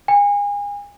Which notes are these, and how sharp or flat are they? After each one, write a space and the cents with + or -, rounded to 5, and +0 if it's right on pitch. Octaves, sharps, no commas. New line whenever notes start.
G#5 -35